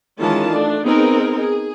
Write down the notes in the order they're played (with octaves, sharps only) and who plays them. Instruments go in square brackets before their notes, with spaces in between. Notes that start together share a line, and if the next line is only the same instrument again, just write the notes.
[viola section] D#3 E3 G#3 C#4 F4 A5
A3 D4
B3 C4 D#4 G#4 A#4
G#4